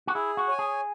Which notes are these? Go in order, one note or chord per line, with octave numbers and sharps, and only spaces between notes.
F#4
E4 G#4
F#4
C#5 G#5
G#4